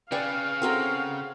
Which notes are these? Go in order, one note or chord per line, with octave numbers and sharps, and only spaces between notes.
C#3 G#4 B4 D5 F5 G5 C#6
C4 F#4 A4 A#4 G5 A#5